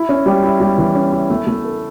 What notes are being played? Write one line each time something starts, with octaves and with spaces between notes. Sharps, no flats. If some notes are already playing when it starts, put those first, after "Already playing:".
Already playing: E4
C#4
G3
E4
G3
E3
C#4
E4
A3
A3
A4